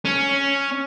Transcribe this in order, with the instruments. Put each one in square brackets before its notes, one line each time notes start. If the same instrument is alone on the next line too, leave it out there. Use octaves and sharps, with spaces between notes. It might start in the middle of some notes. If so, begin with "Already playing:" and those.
[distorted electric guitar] C#4